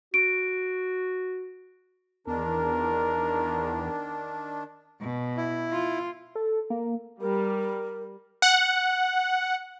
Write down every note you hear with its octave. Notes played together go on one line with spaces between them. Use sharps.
F#4 D7
E2 D#3 D4 A#4
B2
E4
F4
A4
A#3
G3 A#4
F#5